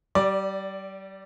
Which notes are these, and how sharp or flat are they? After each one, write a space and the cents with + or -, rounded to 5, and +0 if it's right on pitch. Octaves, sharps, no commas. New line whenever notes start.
G3 -30 D5 +0